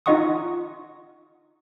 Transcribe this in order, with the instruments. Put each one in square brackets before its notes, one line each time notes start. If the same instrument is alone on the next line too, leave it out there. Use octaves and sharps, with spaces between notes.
[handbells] D#4 F4 D#5 F#5 C#6 D#6